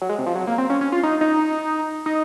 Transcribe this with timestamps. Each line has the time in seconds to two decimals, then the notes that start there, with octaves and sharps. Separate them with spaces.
0.02 F#3
0.09 G#3
0.18 C3
0.26 F3
0.35 F#3
0.47 A#3
0.58 C4
0.70 C#4
0.81 C#4
0.92 F4
1.03 D#4
1.21 D#4
2.06 D#4